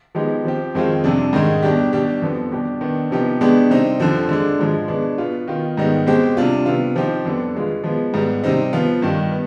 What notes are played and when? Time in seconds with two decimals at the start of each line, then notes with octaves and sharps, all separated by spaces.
0.15 F3 G#3 B3 D#4 G4
0.45 F3 C4 G4
0.75 F2 D#3 G#3 C4 F4
1.04 F2 C3 G3 D4
1.33 G#2 D#3 G#3
1.63 B2 G3 D4 G4
1.93 B2 G3 D4 G4
2.22 F2 D3 F3 B3
2.52 B2 G3 D4 G4
2.81 D#3 B3 D4
3.11 C3 F3 B3 D#4 G4
3.41 B2 G#3 B3 D4 G4
3.70 C3 G3 C4 D#4
4.00 F2 D3 F3 C4
4.29 D3 G#3 D4
4.59 G#2 F3 G#3
4.88 B2 G#3 B3 D4
5.18 B2 B3 F4
5.48 D#3 B3 F4
5.77 G#2 D#3 G3 B3 D#4
6.07 B2 G#3 C4 G4
6.37 C3 G3 D4 F4
6.66 C3 G3 B3 F4
6.96 F3 C4 D#4 G4
7.25 F2 D3 G3 B3 D4
7.55 B2 G#3 B3 F4
7.84 F3 G#3 B3
8.14 G#2 G3 B3
8.44 C3 G3 C4 D#4
8.73 F3 B3 F4
9.02 G2 D#3 G3
9.32 B3